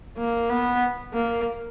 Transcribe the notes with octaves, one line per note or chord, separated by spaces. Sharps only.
A#3
B3
A#3